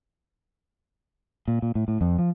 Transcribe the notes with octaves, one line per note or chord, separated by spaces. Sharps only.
A#2
A#2
A2
A2
F2
F3